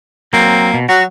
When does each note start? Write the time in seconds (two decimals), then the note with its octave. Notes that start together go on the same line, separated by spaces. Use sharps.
0.33 F#3 A#3 C4
0.74 B2
0.89 F#3 F#4